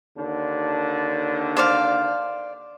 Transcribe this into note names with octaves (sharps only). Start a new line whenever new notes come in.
D#2 D3 D4
C5 D5 F5